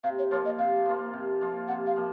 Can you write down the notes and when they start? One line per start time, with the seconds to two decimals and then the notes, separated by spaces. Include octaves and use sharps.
0.04 C3 F5
0.18 C#5
0.31 F3 A#3 F4 C#5
0.45 D#5
0.59 C3 F5
0.86 F3 A#3 F4
1.13 C3
1.41 F3 A#3 F4
1.68 C3 F#5
1.86 F5
1.96 F3 A#3